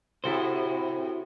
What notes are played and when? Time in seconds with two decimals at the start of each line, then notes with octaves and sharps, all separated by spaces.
0.24 A2 C3 E4 F#4 A4 C5